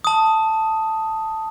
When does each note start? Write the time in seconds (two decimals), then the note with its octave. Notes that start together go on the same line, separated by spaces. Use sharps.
0.04 A5 D#6